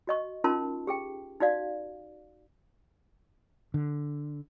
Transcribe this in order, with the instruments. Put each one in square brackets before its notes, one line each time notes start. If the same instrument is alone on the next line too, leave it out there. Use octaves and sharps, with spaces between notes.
[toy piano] F#4 D#5 C#6
C#4 D#4 F4 A#4 A5 C6
G4 G#4 G5
D#4 F#4 D5 F5
[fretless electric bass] D3